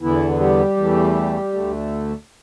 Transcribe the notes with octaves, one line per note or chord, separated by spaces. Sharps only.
E2 D3 E3 B3 E4
G3 G4
E2 E3 A3
D2 D3 A3